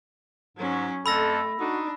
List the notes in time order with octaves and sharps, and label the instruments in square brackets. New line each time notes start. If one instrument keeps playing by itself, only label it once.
[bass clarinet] G#2 [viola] F#3 C#4
[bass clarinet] F2 [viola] A3 [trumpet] A4 [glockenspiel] B5 E6 A#6
[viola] D4 [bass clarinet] D#4 [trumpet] F#4